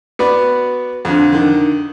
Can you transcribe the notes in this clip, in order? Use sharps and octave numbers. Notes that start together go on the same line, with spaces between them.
B3 F#4 B4 D5
F2 D3
D3 D#3